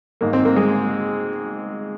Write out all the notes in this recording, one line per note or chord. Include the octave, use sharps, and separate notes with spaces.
G#2 D#3 A#3
C4
A#3
G#3